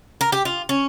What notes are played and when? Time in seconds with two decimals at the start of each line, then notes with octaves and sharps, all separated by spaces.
0.21 A#4
0.32 G4
0.45 F4
0.69 C#4